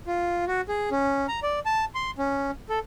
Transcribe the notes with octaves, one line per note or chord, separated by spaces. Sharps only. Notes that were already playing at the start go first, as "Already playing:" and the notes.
F4
F#4
G#4
C#4
A#5
D5
A5
C6
C#4
A4